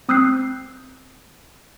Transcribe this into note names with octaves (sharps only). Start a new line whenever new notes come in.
C4 D#6 E6 F#6 G6 C7